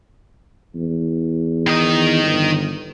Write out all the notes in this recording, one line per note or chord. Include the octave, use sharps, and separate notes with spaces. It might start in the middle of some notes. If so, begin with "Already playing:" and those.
E2
D#3 D#5
G1